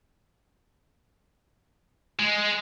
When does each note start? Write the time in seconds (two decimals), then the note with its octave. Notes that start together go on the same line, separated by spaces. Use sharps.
2.19 G#3